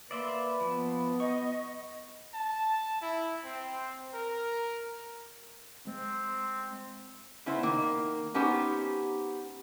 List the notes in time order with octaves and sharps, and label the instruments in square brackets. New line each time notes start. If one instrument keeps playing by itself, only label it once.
[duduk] A#3 [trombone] B4 [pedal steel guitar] D5 E5 C6
[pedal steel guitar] F3 [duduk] B3
[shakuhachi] D#5 [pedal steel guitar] C#6
[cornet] A5
E4
C4
A#4
[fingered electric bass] G#3 [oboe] C4
[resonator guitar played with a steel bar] C#3 B3 E4 C5
D#3 A#3
B3 C#4 D#4 G4 C5